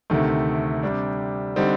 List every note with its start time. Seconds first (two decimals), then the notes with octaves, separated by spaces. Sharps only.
0.10 D2 C3 D#3 A3
0.83 C3 G3 D4
1.56 D3 G3 C4 D#4